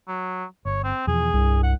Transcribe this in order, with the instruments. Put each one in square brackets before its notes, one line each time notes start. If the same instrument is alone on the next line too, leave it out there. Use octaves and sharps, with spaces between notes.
[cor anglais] F#3
[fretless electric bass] G1 [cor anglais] C#5
[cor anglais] C4
[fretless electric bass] E2 B2 F3 [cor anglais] G#4
[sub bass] C2 [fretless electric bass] G2
[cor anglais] F#5